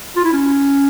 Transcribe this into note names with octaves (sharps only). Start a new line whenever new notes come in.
F4
E4
C#4